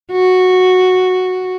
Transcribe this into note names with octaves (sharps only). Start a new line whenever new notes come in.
F#4